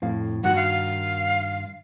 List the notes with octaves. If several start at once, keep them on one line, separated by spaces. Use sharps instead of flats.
F2 A2 F5
G2 D#3 F#4 F#5
F5